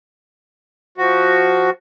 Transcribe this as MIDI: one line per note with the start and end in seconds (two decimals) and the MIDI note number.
0.98 1.70 53
0.98 1.70 66